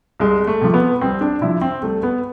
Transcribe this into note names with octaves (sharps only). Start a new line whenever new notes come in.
C2 G#3
A3
C3 F3
B3
C2 C4
D4
C3 F3 E4
C4
C2 A3
B3